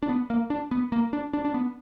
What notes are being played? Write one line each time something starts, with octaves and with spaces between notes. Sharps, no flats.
D4
B3
A#3
D4
B3
A#3
D4
D4
D4
B3